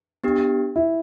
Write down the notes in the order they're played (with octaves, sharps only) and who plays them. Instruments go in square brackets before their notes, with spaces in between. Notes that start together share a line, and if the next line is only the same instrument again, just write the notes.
[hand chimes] B3 D4 G4
[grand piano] E4